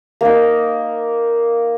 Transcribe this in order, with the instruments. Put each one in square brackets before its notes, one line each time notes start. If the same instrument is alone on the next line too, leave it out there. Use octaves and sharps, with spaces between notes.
[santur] A#3 D#4